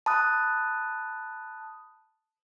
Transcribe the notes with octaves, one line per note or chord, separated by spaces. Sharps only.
A5 B5 D#6 F#6